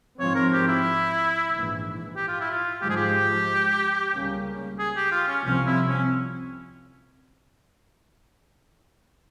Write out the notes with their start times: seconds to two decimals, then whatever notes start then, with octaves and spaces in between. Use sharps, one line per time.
0.19 G#2 F3 C4 C#5
0.35 A#4
0.52 G4
0.68 E4
1.51 A#1 G#2 E3
2.16 G4
2.28 F4
2.40 E4
2.51 F4
2.81 G#2 F3 G#3 G4
2.90 G#4
2.97 G4
4.13 C#2 C#3 G3 A#3 C#4
4.79 G#4
4.96 G4
5.12 F4
5.28 C#4
5.45 C2 C3 F3 C4 C#4
5.67 E4
5.88 C#4